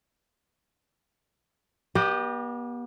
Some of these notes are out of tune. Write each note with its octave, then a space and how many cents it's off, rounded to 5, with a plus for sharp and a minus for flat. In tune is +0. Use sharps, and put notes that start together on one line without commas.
B3 -40 G4 +0 D#5 -25